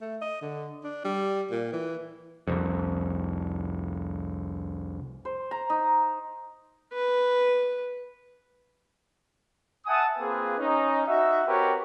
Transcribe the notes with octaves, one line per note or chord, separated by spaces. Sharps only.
A3
D#5
D3
D4
G3
A#2
E3
C2 F2
C5
A#5
D#4
B4
E5 F#5 G#5 A5 D#6
A#3 C4 F4 G#4 B4
C#4 D#4
D#4 F#4 E5
C4 F#4 G4 A#4 B4 C#5